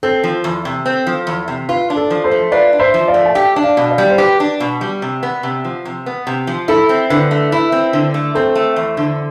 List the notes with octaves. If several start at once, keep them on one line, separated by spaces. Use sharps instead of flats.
C4 A4
F3
E2
C3
C4
F3
E2
C3
F4 B4
D4
A4
F3
A4 C5
A3
F4 B4 D5
D4
C5 E5
F3
D5 F5
A3
A5
G4 E5 G5
D4
D5 F5
B2
D5 F5
G3
C5
G4 B4
D4
B2
G3
C3
B3
C3
F3
C3
B3
C3
F3
E4 A4
C4
D3 B4
A3
E4 B4
C4
D3
A3
C4 A4 C5
A3
E2
D3